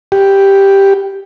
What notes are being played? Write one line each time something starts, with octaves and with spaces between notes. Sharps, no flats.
G4